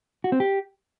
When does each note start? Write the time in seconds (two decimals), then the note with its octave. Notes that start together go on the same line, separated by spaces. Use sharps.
0.24 F#4
0.32 C4
0.40 G4